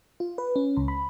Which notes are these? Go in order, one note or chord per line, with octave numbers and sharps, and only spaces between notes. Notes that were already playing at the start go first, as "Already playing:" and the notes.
F4
B4
C#4
C#2
B5